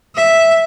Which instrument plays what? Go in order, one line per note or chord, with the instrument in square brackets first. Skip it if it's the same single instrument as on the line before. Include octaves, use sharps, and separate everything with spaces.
[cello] E5